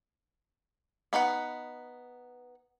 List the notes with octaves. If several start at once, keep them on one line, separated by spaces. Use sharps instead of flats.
B3 D#4 B4 F#5